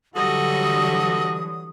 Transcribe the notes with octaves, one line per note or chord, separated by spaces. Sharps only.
D3 E3 F#3 G3 F#4 A4 D#5 D#6